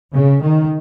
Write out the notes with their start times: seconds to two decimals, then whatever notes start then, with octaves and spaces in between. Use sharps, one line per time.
0.13 C#3
0.41 D#3